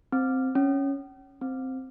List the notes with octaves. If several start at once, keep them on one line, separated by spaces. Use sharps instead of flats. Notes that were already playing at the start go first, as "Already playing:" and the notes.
C4
C#4
C4